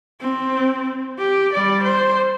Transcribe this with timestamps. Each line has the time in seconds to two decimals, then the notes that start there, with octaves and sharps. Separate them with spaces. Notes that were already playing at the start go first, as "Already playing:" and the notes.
0.21 C4
1.19 G4
1.52 G3 D5
1.83 C5